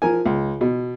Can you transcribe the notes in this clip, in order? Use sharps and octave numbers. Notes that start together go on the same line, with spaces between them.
F3 A#4 G#5
C#2
B2